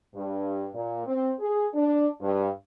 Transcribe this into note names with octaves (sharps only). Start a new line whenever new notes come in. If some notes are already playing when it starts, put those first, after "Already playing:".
G2
A#2
C4
G#4
D4
G2